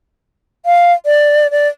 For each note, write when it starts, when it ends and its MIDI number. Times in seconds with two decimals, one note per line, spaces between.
0.66 0.93 77
1.06 1.51 74
1.51 1.68 74